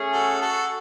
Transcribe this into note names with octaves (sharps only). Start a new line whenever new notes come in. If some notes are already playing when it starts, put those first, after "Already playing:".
Already playing: A3 C#4 G#4
F#4 A4
F#4 A4